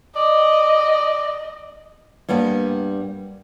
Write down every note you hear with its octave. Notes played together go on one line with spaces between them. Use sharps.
D5 D#5
G2 G3 A#3 B3